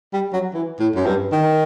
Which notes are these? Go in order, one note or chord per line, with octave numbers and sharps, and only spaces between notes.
G3
F#3
E3
A2
F#2
G2
D#3